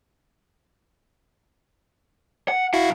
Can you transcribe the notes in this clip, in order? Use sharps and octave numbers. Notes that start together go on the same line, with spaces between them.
F#5
B1 E4 F#4 F5